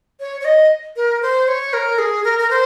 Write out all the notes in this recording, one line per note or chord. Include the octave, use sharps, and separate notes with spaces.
C#5
C#5
D#5
A#4
C5
C#5
A#4
G#4
A#4
A#4
C5